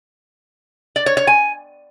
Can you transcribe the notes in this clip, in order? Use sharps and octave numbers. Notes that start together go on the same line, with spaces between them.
D5
C#5
C#5
G#5